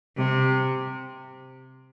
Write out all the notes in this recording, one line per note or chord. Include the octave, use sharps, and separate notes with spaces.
C3